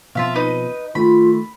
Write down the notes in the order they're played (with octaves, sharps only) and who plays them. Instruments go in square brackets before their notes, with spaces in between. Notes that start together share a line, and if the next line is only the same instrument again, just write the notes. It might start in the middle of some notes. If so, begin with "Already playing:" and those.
[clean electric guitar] B2 F3 C4 [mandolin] F4 E5 F5
[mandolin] D#4 B4 D#5
[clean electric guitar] D#3 A3 [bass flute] F4 [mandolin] B5